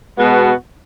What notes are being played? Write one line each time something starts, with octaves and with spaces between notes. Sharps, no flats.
B2 G#3 B3 F#4